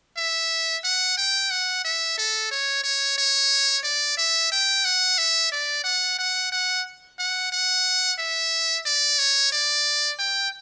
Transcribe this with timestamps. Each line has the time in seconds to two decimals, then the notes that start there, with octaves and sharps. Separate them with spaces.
0.17 E5
0.84 F#5
1.18 G5
1.51 F#5
1.85 E5
2.18 A4
2.51 C#5
2.84 C#5
3.18 C#5
3.84 D5
4.18 E5
4.52 G5
4.85 F#5
5.18 E5
5.52 D5
5.84 F#5
6.19 F#5
6.52 F#5
7.19 F#5
7.52 F#5
8.19 E5
8.86 D5
9.19 C#5
9.52 D5
10.19 G5